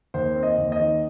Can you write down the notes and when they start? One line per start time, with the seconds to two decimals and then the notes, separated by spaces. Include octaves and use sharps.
0.14 D#2 C5
0.36 C4
0.43 D#5
0.58 D#2
0.72 D#5
0.80 D#3